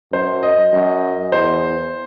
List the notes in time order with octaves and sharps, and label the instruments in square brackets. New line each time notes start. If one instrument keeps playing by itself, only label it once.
[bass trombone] F#2 [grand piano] C5
[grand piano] D#5
[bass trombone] F#2
[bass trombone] E2 [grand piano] C5